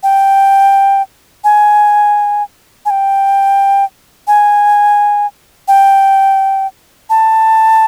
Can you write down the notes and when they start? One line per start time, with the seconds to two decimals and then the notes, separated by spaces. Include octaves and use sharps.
0.03 G5
1.44 G#5
2.85 G#5
2.90 G5
4.27 G#5
5.68 G5
7.10 A5